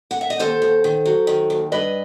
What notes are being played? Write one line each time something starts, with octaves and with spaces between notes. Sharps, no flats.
F#5
E5
D#5
D#2 A4 C5
D#2
D#3
F#3
D#3
D#2
G2 B4 D#5